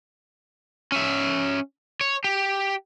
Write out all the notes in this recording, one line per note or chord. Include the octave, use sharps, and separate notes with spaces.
C#4 E5
C#5
G4